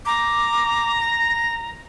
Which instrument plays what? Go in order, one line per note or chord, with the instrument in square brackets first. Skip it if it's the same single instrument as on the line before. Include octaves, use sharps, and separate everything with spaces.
[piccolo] A#5 [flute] D6
[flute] A#6